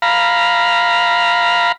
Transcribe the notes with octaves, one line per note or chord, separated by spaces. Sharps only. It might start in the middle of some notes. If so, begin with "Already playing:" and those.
F5 A#5 B5